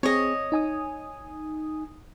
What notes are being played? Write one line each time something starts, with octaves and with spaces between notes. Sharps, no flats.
C4 G#4 C#5 D#5
D#4 G#5 D#6